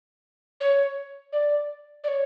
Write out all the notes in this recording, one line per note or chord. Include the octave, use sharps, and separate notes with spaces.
C#5
D5
D5
C#5